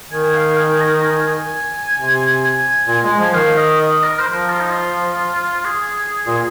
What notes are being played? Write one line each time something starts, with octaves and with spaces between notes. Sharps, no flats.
D#3 G#5
G#5
F5
G#5
A#5
G#5
G#5
C3
G#5
A#2
G#3
F3
D#3 F5
D#5
D#5
A#4
C5
F3 A#4
F4
D#4
F4
G#4
A#2